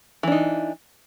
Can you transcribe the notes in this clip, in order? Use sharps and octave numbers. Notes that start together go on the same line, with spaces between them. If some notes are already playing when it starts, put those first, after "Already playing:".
E3 D4 D#4